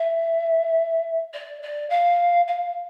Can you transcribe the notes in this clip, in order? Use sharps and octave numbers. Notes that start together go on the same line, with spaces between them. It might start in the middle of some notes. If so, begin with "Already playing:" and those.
Already playing: E5
D5
D5
F5
F5